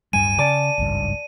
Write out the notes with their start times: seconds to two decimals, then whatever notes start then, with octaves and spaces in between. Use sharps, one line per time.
0.13 D1 G2 G3 G#5 D#7
0.38 C#3 D5 A5
0.78 G#1 C#2 G2